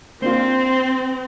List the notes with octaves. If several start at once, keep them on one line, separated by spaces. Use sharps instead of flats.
A#3 C4 D4 F4 C5